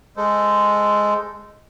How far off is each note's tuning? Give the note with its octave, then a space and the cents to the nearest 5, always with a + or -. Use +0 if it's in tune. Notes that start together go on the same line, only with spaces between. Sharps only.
G#3 +0 A4 +0 C5 -20